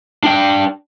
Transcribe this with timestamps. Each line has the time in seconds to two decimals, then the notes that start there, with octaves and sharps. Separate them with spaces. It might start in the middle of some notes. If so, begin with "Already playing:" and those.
0.23 D4 G5